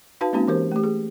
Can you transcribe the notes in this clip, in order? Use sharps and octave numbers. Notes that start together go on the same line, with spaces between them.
D#4 F#4 B4 F5 A5
G#3 A#3 C4 C#4 D#4 F#4
E3 G4 A#4 C5
A3 G4
G#4